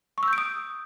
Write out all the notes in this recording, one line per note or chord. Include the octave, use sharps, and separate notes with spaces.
C#6
E6
G6
D7
D#6